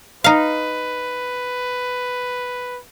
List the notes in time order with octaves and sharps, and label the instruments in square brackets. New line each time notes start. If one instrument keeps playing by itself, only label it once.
[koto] D#4 F5 [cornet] B4